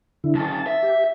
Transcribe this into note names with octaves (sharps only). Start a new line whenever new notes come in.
D3 E4
F#2 C#3 A5
E5
G4